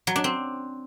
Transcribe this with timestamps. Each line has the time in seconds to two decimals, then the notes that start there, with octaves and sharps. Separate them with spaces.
0.07 F#3
0.16 D4
0.24 C4